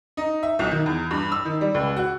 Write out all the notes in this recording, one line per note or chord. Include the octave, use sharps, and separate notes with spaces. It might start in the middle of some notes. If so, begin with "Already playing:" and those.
D#4
E5
B1
D#3
E2
G2
E6
D#3
G3
C#2
F#4